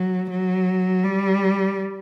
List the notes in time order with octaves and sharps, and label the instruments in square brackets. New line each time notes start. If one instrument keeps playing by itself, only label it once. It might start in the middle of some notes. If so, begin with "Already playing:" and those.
Already playing: [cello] F#3
F#3
G3